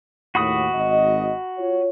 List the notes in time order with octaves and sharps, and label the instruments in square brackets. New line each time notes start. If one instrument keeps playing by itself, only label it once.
[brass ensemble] D#2 A2 [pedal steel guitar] F#4 B5 D#6
[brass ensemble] G#1 D#5
F4 C#5